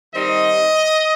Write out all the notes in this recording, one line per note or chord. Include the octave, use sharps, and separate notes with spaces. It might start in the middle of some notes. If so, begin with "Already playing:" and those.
D#3 G3 C4 D#4 D#5